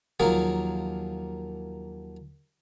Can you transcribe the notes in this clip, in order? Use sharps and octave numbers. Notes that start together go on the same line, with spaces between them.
D#2 F3 F#3 A#3 G#4 F5